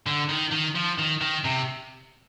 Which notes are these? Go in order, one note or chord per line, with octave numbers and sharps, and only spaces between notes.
D3
D#3
D#3
F3
D#3
D#3
C3